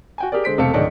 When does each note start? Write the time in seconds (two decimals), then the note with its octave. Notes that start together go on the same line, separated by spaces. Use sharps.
0.18 F#4 G5 G#5
0.32 G4 G#4 A#4 D5
0.44 D3 G#3 C5 B6 D7
0.58 E1 C3 A3 A4 F5 C#7
0.73 D1 G#2 D#3 D4 C#5